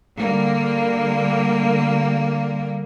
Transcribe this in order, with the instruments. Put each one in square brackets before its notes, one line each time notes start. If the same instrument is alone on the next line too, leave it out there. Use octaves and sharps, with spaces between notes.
[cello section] D3 G3 A#3